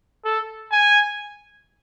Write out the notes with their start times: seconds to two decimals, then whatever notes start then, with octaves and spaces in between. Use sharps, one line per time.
0.25 A4
0.72 G#5